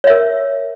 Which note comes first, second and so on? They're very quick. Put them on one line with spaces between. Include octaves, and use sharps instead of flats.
C#5 E5 A#4